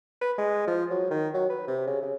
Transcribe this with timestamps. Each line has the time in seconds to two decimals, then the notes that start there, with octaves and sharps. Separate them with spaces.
0.21 B4
0.38 G#3
0.67 F3
0.90 F#3
1.10 D#3
1.34 F#3
1.50 B4
1.68 C3
1.87 C#3
2.02 C#3